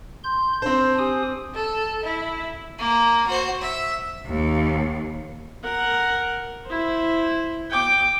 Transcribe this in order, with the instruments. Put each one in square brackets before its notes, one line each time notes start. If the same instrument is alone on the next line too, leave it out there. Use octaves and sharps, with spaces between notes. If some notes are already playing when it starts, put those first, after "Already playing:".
[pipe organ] C6 G6
[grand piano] C4 C5 [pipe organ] D4
[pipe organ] G4 G#5 D#6
[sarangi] A4
E4
[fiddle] A#3
F#4 C5
E5
[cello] D#2
[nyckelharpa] A#4 F#5
E4 C5
G5 D6